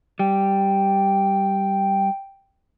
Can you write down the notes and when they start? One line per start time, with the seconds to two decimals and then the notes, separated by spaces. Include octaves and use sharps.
0.19 G3 G5